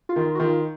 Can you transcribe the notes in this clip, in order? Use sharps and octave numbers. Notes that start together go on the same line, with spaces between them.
F4
D#3
F#4
D#3 F4